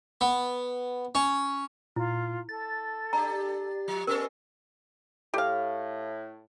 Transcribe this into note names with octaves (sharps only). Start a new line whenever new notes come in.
B3
C#4
A#2 E4 F4
A4 A6
D4 G4 A#5
F3
B3 C#4 A4 A#4 D#5
A2 G4 F5